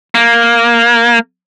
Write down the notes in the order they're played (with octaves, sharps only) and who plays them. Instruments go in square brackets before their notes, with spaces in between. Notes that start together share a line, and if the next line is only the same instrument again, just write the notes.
[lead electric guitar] A#3